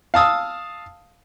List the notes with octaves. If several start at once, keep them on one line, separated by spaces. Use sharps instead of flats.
F5 A5 D#6 E6